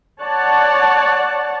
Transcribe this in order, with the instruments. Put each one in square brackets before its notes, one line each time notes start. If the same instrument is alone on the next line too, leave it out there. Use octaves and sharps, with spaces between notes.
[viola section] C#5 D5 F#5 A5